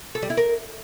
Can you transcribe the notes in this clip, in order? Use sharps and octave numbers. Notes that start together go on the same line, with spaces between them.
A4
G3
E4
A#4